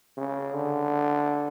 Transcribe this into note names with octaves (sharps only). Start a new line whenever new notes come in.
C#3
D3